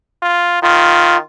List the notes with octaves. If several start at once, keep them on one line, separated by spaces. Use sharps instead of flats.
F4
D#3 F4